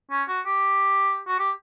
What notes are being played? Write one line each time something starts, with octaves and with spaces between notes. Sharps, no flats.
C#4
F#4
G4
F#4
G4